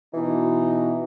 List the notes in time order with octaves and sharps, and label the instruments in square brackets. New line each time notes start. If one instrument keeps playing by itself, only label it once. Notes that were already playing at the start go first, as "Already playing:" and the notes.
[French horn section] B2 D#4 F#4 [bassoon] E3